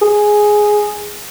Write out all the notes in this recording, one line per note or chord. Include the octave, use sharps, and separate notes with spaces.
G#4